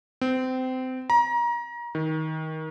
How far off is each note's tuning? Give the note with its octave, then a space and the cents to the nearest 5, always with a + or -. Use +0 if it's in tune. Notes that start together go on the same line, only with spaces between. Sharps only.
C4 -25
A#5 +30
D#3 +20